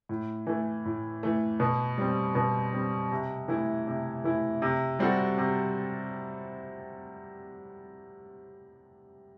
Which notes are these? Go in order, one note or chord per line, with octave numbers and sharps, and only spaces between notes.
A2
E3 A3
A2
E3 A3
B2
G3 C4
B2
G3 C4
C3
E3 A3 E4
C3
E3 A3 E4
C3
G3 C4 F#4 A4
C3